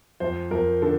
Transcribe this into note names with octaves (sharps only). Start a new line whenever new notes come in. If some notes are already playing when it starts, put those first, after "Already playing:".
F2 C5
F2 A#4
D3 A4